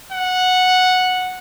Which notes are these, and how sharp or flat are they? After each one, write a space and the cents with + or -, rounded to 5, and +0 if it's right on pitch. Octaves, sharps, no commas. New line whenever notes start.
F#5 -10